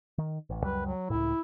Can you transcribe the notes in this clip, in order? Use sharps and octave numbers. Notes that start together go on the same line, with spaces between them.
D#3
A1
C#2 F#2 G3 B4
F#3
C#2 A2 E4